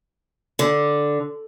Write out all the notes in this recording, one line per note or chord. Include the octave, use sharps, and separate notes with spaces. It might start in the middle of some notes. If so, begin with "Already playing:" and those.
D3